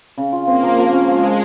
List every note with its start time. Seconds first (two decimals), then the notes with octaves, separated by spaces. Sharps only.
0.18 C#3
0.32 F4
0.47 A#3 C4
0.63 F3
0.78 F3
0.93 C#4
1.08 F3 G#3
1.24 F3